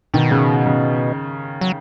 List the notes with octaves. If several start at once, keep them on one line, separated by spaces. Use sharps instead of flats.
B2 D#3
C#3
C#3
F#3